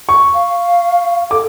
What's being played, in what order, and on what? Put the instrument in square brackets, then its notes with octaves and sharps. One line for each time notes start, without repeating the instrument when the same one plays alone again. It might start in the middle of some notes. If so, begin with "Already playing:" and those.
[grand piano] C#6
[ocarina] F5
[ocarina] A4 [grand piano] D6